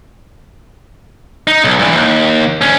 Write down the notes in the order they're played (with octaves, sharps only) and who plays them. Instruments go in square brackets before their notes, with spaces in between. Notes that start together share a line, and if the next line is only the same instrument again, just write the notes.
[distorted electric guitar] D#4
B1
G2 E3
D#2
D2 C#4